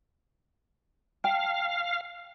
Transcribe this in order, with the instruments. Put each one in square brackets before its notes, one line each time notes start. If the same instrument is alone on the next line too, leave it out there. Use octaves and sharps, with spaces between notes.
[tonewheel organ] F5 [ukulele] G5 A5